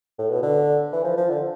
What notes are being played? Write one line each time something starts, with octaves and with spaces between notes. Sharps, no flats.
A2
B2
D3
E3
F3
F3
D3